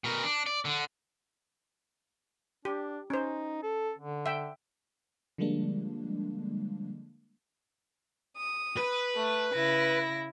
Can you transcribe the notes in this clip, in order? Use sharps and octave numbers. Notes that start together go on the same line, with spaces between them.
B2 A#4
D4
D5
D3
D4 G4
C#4 D#4 C5
A4
D3
E5 G5
D3 F3 G3 G#3 A#3 D4
D#6
B4
A3
C#3 E4 A#6